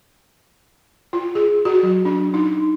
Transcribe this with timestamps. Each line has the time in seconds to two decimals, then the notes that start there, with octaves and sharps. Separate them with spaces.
1.13 F4
1.35 G#4
1.65 F#4
1.83 F#3
2.05 D4
2.34 D#4